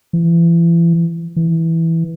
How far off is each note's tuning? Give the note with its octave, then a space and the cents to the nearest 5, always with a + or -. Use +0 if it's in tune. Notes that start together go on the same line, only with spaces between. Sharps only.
E3 +35
E3 -5